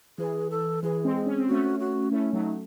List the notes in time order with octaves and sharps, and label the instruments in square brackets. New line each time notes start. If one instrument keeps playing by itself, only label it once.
[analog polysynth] E3 [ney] G#4
[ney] A4
[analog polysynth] E3 [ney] G#4
[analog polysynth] G#3 C4
[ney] G#4
[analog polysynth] C#4
C4
[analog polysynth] A3 C#4 [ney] F#4
[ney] F#4
[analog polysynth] A3 C#4 [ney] E4
[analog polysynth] F#3 A3 [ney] D#4